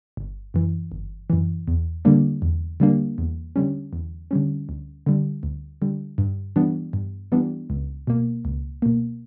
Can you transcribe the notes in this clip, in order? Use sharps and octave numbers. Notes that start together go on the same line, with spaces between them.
G1
F#2 E3
G1
F#2 E3
E2
D3 G3 A#3 D4
E2
D3 G3 A#3 D4
E2
D3 G3 C#4
E2
D3 G3 C#4
D2
D3 G3
D2
D3 G3
G2
E3 G3 B3 D4
G2
E3 G3 B3 D4
C#2
B2 A#3
C#2
B2 A#3